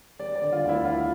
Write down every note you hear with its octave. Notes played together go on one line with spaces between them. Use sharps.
G3 D5
D5
D3
F4
D2
E4
D2 F4